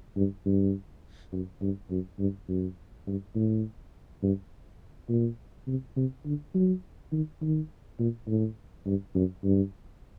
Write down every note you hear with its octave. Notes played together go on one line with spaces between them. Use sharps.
G2
G2
F#2
G2
F#2
G2
F#2
G2
A2
G2
A#2
C3
C3
D3
F#3
D#3
D#3
A#2
A2
G2
F#2
G2